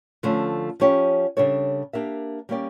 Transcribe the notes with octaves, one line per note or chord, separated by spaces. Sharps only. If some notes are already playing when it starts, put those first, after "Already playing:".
D3 F3 A3 C#4
F3 C#4 G4 C#5
C#3 G3 D4 A4 C#5
A#3 D4 G4 A#4 E5
G3 A#3 C#4 G4 D5